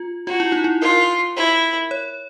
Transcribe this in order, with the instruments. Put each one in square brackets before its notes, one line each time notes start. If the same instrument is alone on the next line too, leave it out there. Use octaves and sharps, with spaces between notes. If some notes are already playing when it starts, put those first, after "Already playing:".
Already playing: [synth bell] F4
[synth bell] F4 [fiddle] F#4
[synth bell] E4
D#4
E4
[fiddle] F4 [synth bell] A#4
[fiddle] E4
[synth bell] C#5